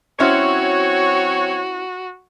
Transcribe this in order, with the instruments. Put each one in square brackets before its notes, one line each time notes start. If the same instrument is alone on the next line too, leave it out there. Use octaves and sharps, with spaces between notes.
[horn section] F#3 C4 C#5 [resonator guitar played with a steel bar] C#4 E4 C5 [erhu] F#4